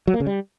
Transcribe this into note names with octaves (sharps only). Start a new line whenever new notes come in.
F#3
A#3
C#3
G3